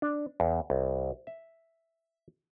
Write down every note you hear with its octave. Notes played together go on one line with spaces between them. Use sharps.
D4
E2
C2
E5